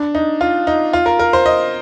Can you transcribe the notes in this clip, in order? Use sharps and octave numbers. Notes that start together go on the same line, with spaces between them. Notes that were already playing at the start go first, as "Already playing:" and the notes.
Already playing: D4
D#4
F4
D#4
F4
A#4
A#4
C5
D#5